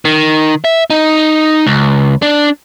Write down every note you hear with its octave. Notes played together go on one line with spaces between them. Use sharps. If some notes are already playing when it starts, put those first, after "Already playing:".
D#3
E5
D#4
C#2
D4